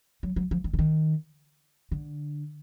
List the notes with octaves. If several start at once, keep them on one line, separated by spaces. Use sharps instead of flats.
F#3
F#3
F3
D#3
D3
D#3
D3